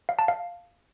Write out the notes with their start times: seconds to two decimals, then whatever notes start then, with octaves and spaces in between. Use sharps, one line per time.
0.09 F5
0.19 A5
0.28 F5